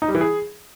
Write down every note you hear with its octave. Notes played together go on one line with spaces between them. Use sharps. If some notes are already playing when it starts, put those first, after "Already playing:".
D#4
G3
E3
G#4